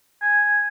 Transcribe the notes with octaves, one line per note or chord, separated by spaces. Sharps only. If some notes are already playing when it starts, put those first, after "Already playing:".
G#5